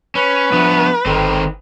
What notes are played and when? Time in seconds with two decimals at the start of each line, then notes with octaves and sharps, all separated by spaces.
0.15 C#4 B4
0.52 F3 A3 B3 D4
1.06 G1 D#3 C4 A4 C6